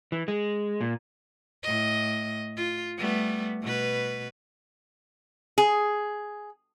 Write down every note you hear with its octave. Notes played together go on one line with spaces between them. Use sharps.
E3
G#3
A#2
A2 D#5
F4
G3 A3 B3
B2 B4
G#4